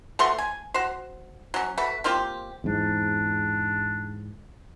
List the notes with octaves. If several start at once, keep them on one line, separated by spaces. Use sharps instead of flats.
A3 F#4 B4 C6
G#5
F#4 C5
F#3 C#4
A3 F#4 B4
A#3 C4 F4 G4
E2 G#2 D4